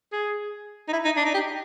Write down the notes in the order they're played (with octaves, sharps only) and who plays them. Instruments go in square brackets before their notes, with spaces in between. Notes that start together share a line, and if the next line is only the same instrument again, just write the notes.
[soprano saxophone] G#4
D#4
E4
D#4
D4
D#4
G4